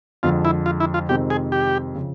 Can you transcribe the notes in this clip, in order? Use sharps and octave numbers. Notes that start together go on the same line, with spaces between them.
F2 D3 F3 G#3 F4
E4
F4
E4
F4
F2 C3 D#3 G#3 C4 G4
G#4
G4
C#3 F3